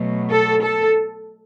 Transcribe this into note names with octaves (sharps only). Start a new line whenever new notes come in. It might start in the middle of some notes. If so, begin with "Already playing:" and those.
Already playing: B2 F#3 A3
A4
A4